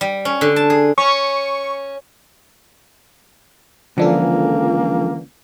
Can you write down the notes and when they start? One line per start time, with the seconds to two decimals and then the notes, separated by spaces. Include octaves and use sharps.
0.01 G3
0.25 C#4
0.41 D3
0.56 A5
0.70 G#4
0.98 C#4 C#6
3.98 C#2 D3 E3 F3 A#3 D4 A4